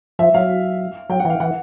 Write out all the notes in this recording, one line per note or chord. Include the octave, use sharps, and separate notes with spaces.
F3 E5
F#3 F5
F#3 G5
F#5
E3 F5
E3 F#5